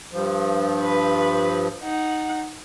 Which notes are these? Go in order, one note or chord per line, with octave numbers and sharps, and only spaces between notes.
G2 F3
B4
D#4 F#5